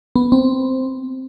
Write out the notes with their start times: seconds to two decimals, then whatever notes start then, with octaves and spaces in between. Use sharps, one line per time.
0.16 B3
0.32 C4